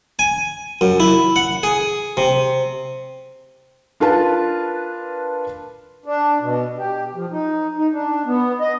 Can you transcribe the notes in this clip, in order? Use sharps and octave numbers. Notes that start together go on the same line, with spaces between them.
G#5
F#2
E4
F#5
G#4
C3
D4 F4 A#4 B4 A5
D4
B2
G4
F3
D#4
D#4
D4
B3
D#5